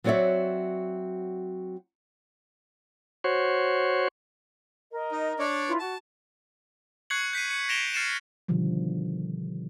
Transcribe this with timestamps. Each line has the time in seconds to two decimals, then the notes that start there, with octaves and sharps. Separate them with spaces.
0.04 F#3 C4 F#4 C#5 D5 E5
3.24 F#4 C5 C#5
4.91 A#4 D#5
5.12 D#4
5.39 D4 C#5 D5
5.66 E4 F4 B4
5.79 F#4 A5
7.10 C#6 F#6 G#6 C7 C#7 F#7
7.33 G6 B6 C7 D#7
7.51 C#7
7.69 A#6 D7 E7 F7 G7
7.94 F6 A6 C7 C#7 D#7 E7
8.48 B2 D3 D#3 F3 G3